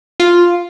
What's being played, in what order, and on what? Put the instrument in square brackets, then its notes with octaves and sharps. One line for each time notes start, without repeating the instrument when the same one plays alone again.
[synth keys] F4